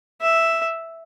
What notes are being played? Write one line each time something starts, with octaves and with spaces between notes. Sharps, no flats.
E5